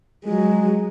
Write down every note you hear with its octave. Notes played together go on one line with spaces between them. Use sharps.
F#3 G#3